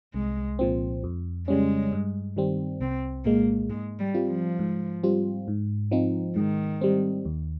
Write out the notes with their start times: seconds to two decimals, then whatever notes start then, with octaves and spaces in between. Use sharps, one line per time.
0.14 C2 G#3
0.59 A#2 F3 C4
1.04 F2
1.48 C#3 G3 G#3 C#4
1.92 G2
2.36 D#3 G3 C4
2.80 C2 C4
3.25 A#2 G#3 A#3
3.69 G#2 G#3
3.99 G3
4.14 G3 C4 F4
4.28 F3
4.59 G#2
5.03 G3 C4 F4
5.48 G#2
5.91 F3 C4 D#4
6.36 G#2 D#3
6.81 G3 C4
7.25 D#2